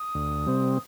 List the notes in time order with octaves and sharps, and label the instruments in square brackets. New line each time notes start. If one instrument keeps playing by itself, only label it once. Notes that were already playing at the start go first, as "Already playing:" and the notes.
Already playing: [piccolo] D#6
[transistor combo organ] D2
C3 G3 C4